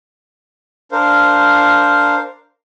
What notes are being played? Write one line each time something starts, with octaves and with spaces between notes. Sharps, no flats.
D4 A#4 C5 F5